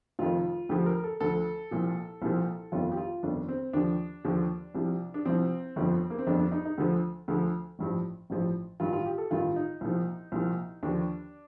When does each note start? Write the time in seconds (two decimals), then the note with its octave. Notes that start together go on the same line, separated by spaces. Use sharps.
0.19 F1 F2 D#3 F4
0.69 D2 D3 F3 G4
0.86 A#4
1.04 A4
1.20 D2 D3 F3 A4
1.71 C2 A#2 F3
2.22 C2 A#2 F3
2.72 G1 F2 D#3 F4
2.91 G4
2.97 F4
3.23 G1 F2 D#3 D4
3.49 C4
3.73 D#2 D3 F3 D4
4.25 D#2 D3 F3
4.75 C2 C3 F3
5.14 D4
5.25 C2 C3 F3 C4
5.76 G1 F2 D3 F3
6.10 A#3
6.19 C4
6.27 G1 F2 D3 F3 D4
6.40 D4
6.52 D#4
6.65 D#4
6.78 D2 D3 F3
7.28 D2 D3 F3
7.79 A1 G2 F3
8.30 A1 G2 F3
8.80 A1 G2 D#3 F4
8.93 F4
9.06 G4
9.18 A4
9.31 A1 G2 D#3 F4
9.56 D#4
9.81 C2 A#2 F3
10.32 C2 A#2 F3
10.83 D#2 D3 F3 D4